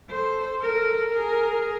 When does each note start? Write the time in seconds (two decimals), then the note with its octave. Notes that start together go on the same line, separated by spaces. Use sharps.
0.10 A4 C5
0.62 A4 A#4
1.13 G#4 A#4